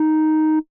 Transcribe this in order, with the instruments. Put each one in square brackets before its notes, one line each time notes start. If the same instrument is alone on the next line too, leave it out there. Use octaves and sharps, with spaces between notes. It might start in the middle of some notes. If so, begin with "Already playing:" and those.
Already playing: [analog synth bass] D#4